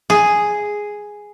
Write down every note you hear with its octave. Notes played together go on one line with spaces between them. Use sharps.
G#4